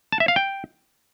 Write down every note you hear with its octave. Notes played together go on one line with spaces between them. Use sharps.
A5
E5
F5
G5